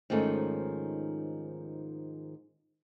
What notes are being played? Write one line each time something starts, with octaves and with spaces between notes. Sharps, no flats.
G#2 D#3 F3 A3 C#4